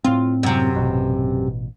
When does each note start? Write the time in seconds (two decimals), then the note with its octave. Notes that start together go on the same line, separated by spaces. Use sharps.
0.04 A2 C4 F4
0.43 F#2 C3
0.76 A1 B2